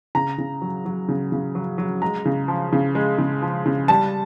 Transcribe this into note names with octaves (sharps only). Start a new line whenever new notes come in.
C#3 A#5
C#3
F#3
F#3
C#3
C#3
F#3
F#3
G#3 A#5
C#3
F3
C#3
G#3
C#3
F3
C#3
G3 A5